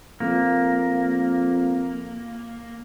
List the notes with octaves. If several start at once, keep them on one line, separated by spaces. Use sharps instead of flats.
F2 A#3